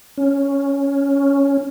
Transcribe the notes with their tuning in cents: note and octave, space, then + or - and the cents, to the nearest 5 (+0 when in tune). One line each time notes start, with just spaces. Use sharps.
C#4 +5